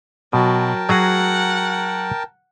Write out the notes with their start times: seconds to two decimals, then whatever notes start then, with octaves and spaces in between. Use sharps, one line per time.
0.33 B2 F#3 A#4 G5 A5
0.89 F#3 F#4 G#4 F#5